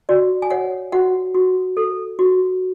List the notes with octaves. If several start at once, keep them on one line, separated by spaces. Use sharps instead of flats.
F#4 D5
G#5
C#5 F#5
F#4 F#5
F#4
A4
F#4